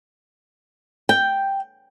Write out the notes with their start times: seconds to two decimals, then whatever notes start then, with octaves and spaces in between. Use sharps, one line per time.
1.09 G5